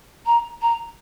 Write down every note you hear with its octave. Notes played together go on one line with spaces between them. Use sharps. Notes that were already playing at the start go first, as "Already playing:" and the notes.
A#5
A#5